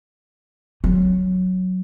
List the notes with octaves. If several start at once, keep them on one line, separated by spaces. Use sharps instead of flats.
F#3